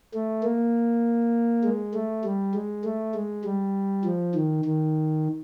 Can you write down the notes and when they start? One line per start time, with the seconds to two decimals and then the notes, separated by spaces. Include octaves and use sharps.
0.14 A3
0.43 A#3
1.64 G#3
1.94 A3
2.24 G3
2.54 G#3
2.84 A3
3.14 G#3
3.44 G3
4.04 F3
4.35 D#3
4.65 D#3